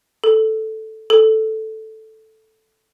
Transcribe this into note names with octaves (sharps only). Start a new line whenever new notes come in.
A4
A4